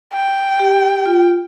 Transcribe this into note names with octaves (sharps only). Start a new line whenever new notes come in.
G5
G4
F4